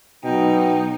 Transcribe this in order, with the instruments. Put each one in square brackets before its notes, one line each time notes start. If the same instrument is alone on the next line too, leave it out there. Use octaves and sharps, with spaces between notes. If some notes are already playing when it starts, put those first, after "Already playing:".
[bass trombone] B2 [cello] F#3 D#4 [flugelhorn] G5